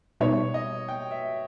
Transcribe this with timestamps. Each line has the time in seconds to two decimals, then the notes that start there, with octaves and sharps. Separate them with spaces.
0.21 B2 G3 B3 D#4 C#5
0.54 D#5
0.88 G5
1.11 E5